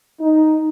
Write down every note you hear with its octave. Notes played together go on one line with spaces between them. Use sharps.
D#4